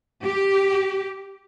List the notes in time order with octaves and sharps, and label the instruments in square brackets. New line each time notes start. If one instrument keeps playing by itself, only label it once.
[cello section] G4